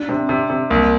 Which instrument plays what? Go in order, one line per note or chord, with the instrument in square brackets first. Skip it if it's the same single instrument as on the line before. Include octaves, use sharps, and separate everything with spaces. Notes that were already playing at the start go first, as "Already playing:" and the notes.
Already playing: [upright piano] D4
[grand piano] C3 [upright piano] C4
[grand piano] C3
C3
[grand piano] C2 [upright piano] A#3